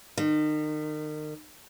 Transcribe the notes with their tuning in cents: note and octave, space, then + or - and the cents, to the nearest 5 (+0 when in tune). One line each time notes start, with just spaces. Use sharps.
D#3 -35